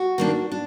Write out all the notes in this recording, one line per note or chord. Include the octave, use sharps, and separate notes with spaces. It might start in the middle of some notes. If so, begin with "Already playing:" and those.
Already playing: F#4
D#3 A#3 D4
D4